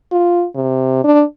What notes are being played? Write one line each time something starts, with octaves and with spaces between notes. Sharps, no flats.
F4
C3
D4